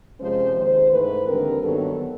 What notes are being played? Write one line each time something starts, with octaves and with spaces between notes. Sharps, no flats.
F2 C3 F3 G#3 C#4 C5
D#2 D#3 G#3 C5
G#2 E3 A3 B4
D#2 D3 G3 C4 A#4
G2 D#3 F#3 B3 A4